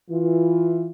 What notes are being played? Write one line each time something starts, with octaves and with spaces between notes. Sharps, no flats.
E3 F4